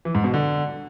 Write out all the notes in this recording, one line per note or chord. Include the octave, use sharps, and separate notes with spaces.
E3
G#2
B2
D3